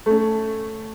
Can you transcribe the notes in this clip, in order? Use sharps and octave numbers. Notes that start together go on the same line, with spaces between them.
A3 C#4